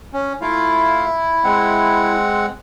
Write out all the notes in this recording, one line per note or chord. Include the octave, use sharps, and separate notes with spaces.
C#4
A3 E4 F4 F5
G#3 C4 F#5